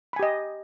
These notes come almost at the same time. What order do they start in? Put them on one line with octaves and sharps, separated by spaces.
B5 G#5 G4 D#5